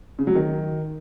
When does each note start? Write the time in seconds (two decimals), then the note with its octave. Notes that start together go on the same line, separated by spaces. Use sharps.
0.19 C#3
0.27 F#3
0.35 D#3